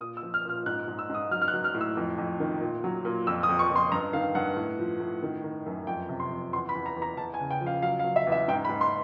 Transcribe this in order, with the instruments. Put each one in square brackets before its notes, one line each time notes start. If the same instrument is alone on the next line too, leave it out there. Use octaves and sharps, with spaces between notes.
[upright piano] A#2 D#6
E6
F3
F6
A#2 F6
G#2 F#6
G#2
E6
G#2 D#6
F#3 F6
F6
F#6
F#3
F6
A2
E6
F2
F2
D#3
A#2
F#3
A#2
F2 E6
D#6
F2
C#6
F2 C6
G2 A#5
D#3 F5
G2 F#5
A2
F3
A2
D#3
D#3
F#2
F2 G5
C3
C6
F2
E2 C6
B5
E2
A#5
E2
A#5
E2 A5
G#5
C#3
G5
F3
F5
F#3 F5
F5
F#3
E5
E2
E5
G#2 G5
B5
G#2
C6